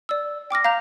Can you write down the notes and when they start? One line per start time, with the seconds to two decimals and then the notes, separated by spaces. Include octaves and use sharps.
0.09 D5 E6
0.50 G5 D6 F6 A#6
0.64 F5 A#5 G6 F7